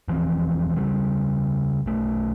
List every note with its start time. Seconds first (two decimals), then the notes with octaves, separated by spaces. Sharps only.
0.08 E1 E3 F3 C4
0.77 C#2 C#3 G3
1.86 B1 A3